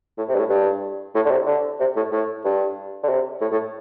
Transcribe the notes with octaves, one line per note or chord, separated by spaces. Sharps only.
A2
C3
G2
A2
G2
A2
D3
C3
D3
C3
A2
A2
G2
D3
C3
A2
A2